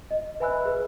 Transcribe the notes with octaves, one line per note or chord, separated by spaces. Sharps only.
D#5
B4 E5 G#5 B5 E6 F#6
G#4 B4